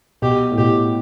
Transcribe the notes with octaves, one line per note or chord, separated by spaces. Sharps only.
B2 G4
A2
B2 G4